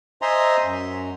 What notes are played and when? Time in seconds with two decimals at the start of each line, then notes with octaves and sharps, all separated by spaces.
0.22 C5 D#5 E5 G#5 A#5 C6
0.64 F#2